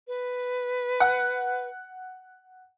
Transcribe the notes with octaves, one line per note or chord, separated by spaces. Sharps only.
B4
F#5